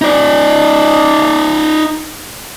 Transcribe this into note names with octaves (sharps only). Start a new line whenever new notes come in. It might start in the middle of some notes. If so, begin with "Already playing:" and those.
D#4 D5